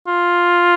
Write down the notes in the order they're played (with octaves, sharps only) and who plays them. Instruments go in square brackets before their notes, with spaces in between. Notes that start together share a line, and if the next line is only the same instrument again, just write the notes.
[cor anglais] F4